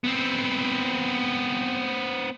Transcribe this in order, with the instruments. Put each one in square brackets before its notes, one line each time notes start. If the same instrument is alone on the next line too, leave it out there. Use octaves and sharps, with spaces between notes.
[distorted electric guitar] B3 C4